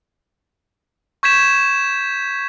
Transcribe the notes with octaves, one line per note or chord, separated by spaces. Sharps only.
C#6 G6 G#6 B6 E7